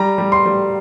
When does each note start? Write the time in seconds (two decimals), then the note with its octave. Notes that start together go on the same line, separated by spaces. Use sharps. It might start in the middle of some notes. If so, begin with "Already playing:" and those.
Already playing: G3 A#5
0.18 G3
0.32 C6
0.45 G3